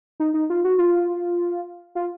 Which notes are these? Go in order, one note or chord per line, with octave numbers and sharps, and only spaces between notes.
D#4
D#4
F4
F#4
F4
F4